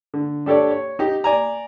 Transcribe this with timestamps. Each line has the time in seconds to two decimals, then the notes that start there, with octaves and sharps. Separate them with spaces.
0.14 D3
0.46 D4 G4 A4 C#5 D5
0.71 C#5
0.99 D#4 G4
1.24 D5 G#5 A#5